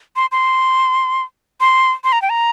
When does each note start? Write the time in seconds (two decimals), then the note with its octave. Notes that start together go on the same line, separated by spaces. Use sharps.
0.16 C6
0.32 C6
1.60 C6
2.04 C6
2.12 A#5
2.22 G5
2.30 A#5